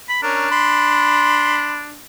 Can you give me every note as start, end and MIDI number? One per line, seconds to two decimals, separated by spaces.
0.09 0.19 83
0.23 0.51 61
0.23 2.04 62
0.23 0.51 70
0.51 1.81 83
0.51 1.81 84